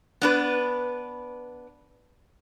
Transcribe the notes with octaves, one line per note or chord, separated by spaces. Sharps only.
B3 D4 B4